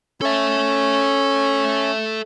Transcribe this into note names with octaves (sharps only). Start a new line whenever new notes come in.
C#4 A4 E5